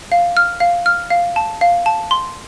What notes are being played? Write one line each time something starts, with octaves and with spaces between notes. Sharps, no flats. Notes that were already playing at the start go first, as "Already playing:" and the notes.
F5
F6
F5
F6
F5
A5
F5
A5
C6